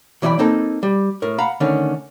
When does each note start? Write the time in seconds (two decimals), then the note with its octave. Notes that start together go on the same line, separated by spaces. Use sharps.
0.22 B1 E3 D5 D#5 G5 B5
0.39 A#3 C4 D#4 A4
0.83 G3
1.22 A2 A#4
1.38 F5 F#5 A#5 B5
1.60 D3 D#3 A3 C#4